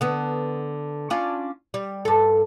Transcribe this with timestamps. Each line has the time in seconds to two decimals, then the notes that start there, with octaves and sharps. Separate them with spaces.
0.01 D3 B3
1.10 C#4 D4 F4
1.74 G3
2.05 G2 A4